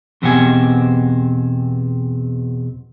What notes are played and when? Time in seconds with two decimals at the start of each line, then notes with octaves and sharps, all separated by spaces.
0.22 E2 B2 C4 G4 F#5 G#5